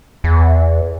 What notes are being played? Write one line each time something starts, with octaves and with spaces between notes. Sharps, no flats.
E2